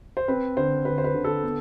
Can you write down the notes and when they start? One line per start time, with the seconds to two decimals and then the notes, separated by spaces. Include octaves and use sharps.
0.17 C5
0.28 C4 B4
0.57 D3 C5
0.85 D3 B4
0.98 C5
1.04 B4
1.14 D3
1.24 A4
1.44 B3